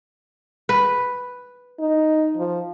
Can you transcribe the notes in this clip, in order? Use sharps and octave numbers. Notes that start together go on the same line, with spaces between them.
B4
D#4
F3